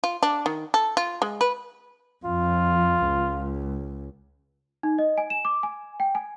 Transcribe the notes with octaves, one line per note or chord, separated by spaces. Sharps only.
F4
D4
D#3
A4
F4
G#3
B4
F2 F4
C#2
D#4
D#5
G#5
E7
D6
G#5
G5
G#5